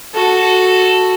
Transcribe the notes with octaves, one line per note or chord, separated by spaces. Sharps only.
F#4 A4